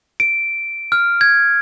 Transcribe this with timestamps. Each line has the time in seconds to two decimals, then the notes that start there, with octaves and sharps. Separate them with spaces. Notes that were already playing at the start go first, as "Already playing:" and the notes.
0.20 D7
0.92 F6
1.21 G#6